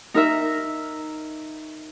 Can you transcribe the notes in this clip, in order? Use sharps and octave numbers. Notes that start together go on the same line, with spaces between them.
D#4 A#4 E5